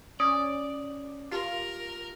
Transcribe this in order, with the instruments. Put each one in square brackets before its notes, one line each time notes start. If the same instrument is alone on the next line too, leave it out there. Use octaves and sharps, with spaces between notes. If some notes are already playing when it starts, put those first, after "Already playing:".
[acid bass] C#4 [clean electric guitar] D5 [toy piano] D#6
[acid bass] F4 [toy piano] G4 [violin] A#4